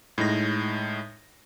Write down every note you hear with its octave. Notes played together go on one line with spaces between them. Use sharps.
A2 G#3 D#4 A#6